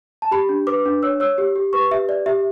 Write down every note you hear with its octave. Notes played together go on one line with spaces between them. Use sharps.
A5
G4 B5
D4
B4 D6
D4
C#5 E6
C#5 E6
G4
G4
B4 C#6
G4 E5
D5
G4 E5